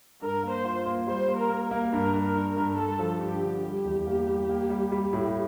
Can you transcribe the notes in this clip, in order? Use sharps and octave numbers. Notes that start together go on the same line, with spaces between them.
G2 A#4
A#3
C5
F4
A#3
G3 C5
A#3
A#4
A#3
A#4
A#3
G2 A#4
G2
A#4
G2
A#4
G2
G2 A4
F3
G2 G4
D3
G3 G4
E2
A#3
G3
A#3
G3
G3
A2